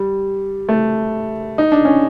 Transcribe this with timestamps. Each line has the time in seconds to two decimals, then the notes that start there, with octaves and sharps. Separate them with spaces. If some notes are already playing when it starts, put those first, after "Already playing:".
Already playing: G3
0.69 A3
1.58 D#4
1.72 D4
1.85 C#4